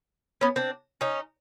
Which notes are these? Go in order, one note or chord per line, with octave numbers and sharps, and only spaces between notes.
B3 C#4
C4 D4
C#4 D#4